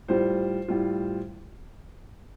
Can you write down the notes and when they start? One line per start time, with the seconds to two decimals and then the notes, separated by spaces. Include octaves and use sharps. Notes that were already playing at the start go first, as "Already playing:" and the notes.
0.08 A2 G3 F4 C5
0.68 A2 G3 F4